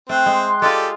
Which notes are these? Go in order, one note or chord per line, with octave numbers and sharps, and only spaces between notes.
A3 C4 G5 C6 F#6
G#3
G#3 F4 G4 A4 D5